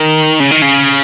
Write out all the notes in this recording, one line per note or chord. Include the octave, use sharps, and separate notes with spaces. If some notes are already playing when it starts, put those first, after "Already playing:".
Already playing: D#3
C#3
D#3
C#3